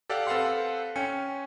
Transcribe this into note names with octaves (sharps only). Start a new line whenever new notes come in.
G4 A4 D5 F5 F#5
C4 A4 B4 F5 F#5 C6
C#4 G5 G#5 C#7